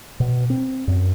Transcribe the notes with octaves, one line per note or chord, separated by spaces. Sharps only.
B2
C4
F#2